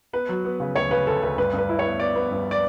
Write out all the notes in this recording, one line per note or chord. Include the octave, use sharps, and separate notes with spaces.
B3 B4
F#3
B3
C#3
D2 C#5
C#3 B4
D2 A4
D2 B4
G2 B4
G2
B4
E4
C#5
B3
B3 D5
B3
G2
D5